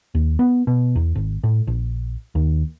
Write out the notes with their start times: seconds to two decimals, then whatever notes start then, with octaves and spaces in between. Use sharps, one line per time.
0.15 D#2
0.39 B3
0.67 B2
0.95 E2
1.15 G#1
1.44 A2
1.67 A#1
2.35 D#2